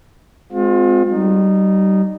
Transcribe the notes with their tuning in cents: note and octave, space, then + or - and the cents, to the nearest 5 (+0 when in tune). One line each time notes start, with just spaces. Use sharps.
G#3 +0 C4 -20 F4 +35
G3 -30 D#4 -15